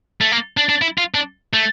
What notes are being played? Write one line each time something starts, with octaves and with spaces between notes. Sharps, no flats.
A3
A#3
D4
D4
E4
F4
D4
A3